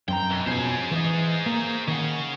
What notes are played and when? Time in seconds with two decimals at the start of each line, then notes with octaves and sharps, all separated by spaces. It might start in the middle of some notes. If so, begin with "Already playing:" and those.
0.08 F#2 C4 G5 A#5
0.29 B1
0.47 F2 B2 C#4 G#4 C5
0.91 E3 D#5
1.46 A#3
1.88 D#3 C#4 G#4 F#5